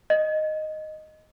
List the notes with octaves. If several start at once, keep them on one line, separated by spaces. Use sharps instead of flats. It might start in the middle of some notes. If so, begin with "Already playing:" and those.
D#5